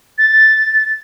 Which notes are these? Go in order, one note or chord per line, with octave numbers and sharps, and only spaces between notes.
A6